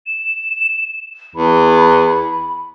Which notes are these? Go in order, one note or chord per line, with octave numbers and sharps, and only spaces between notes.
E7
E2 B5